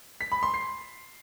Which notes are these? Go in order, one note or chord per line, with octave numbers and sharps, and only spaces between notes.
B6
B5
C6
C7